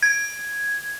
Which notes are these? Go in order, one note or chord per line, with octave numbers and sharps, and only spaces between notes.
G#6